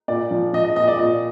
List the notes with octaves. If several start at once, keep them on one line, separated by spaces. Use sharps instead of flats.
A#2 D5
F3
F3 D#5
D#5
A#2 D#5
D5
A#2 D#5